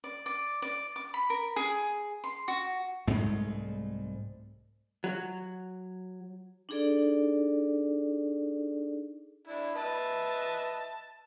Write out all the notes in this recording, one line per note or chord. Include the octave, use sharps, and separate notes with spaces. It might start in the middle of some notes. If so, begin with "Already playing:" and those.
D5
D5
D5
D6
B5
A#4
G#4
C6
F#4
C2 G#2 G#3 A3
F#3
D4 D#4 G#4 A4 D5
D4 E4
B4 D#5 E5 A5